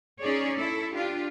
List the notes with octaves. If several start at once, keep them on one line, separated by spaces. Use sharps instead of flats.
C#4 D#4 G#4 C#5 D5
E4 A4
D4 F4 G4